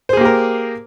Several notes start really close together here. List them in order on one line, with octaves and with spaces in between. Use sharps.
C5 G#4 A#3 G4 A#4